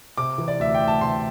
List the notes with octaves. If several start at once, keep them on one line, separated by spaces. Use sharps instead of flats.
C3 D6
E3
D5
D2 E5
G5
D2
A5
C3 C6